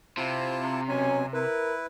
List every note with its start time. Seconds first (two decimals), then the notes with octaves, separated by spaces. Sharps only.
0.17 C3 C4 E4 F4 A5
0.89 B2 F#3 C#4 G#5
1.33 E4 A#4 B4